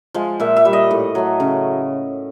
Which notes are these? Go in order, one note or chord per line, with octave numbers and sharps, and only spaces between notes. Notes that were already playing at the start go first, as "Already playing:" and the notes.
F3 G#3
A#2 E5
E5
G3
D#5
A2
F#3 A3
C#3